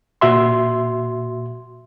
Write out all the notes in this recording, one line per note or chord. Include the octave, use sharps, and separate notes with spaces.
A#2 F#4 E5 C6